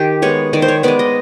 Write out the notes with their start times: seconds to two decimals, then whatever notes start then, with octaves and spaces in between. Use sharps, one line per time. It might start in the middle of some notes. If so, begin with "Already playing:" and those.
Already playing: D#3 G4
0.22 G#3 B3 C#5
0.53 D#3 D5
0.62 C5
0.68 C#5
0.83 G#3 B3 D5
0.99 D#5